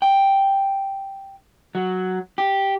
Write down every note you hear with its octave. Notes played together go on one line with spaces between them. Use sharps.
G5
F#3
G4